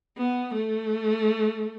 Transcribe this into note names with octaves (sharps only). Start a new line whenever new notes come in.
B3
A3